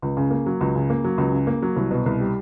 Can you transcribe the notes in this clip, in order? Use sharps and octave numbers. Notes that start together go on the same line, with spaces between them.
C#2
C#3
A#3
F#3
C#2
C#3
A#3
F#3
C#2
C#3
A#3
F#3
C2
B2
C2
G3